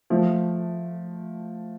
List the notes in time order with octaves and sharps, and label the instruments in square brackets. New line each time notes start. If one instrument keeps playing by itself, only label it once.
[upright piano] F3 A3